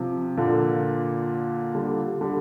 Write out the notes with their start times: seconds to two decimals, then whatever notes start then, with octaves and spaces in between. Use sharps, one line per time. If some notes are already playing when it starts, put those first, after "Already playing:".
Already playing: C3 F3
0.37 A#2 D3
1.75 D3 G3
2.21 D3 G3